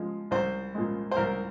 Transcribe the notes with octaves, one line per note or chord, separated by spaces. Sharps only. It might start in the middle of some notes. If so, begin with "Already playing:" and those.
Already playing: F3 G#3
C2 C5
A#2 G#3
C5
C2 A#4